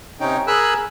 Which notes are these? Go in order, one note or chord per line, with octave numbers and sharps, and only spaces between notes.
C3 C#4 D#4 G5
G#4 A#4 G#5 B5 E6 F#6